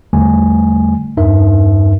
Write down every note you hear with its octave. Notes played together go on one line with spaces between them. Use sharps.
E2 D3 G3 A3 G#5
E2 G2 D#4 A#4 E5